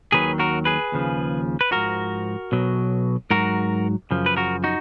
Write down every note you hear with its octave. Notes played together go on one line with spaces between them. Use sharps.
D#2 D#3 F#3 G#4 B4
F#4 A#4
G#4 B4
D#2 C#3 F3
B4
G#2 F3 F#4 A#4
B1 B2 F#3
G#2 F#3 F#4 A#4
F#2 C#3 F3
B4
F#4 A#4
D#4 F#4